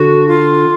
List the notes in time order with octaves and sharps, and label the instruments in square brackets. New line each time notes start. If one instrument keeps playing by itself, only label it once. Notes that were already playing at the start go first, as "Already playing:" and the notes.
Already playing: [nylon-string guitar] D3 [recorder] F#4
[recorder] F4